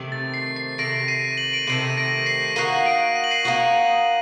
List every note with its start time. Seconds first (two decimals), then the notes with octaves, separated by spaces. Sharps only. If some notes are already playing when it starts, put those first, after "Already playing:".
Already playing: C3 D#3 A3
0.12 A6
0.34 C7
0.56 C7
0.78 C3 D#3 A3 A#6 D7
1.08 C7 D#7
1.37 F#7
1.53 D7 F#7
1.67 C3 D#3 A3 C7 D#7
1.90 D#7
1.97 A#6 D7
2.26 C7 D#7
2.56 A#3 D#4 F#4 C7 D#7
2.86 A#6 D7
3.16 D#7
3.24 F#7
3.31 C7 D#7
3.45 A#3 D#4 F#4